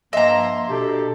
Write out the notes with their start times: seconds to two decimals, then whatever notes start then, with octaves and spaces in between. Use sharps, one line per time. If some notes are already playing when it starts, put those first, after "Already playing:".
0.13 G2 F3 A#3 D#5 E5 A#5 C6
0.68 B2 D4 G4 A4